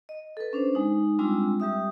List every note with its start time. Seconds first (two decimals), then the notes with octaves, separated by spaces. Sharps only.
0.09 D#5
0.37 A4 B4
0.53 C#4 D4 C5
0.75 G#3 D#4
1.19 G3 G#3 C4 D4 F4 E6
1.60 G3 G4 E5 D#6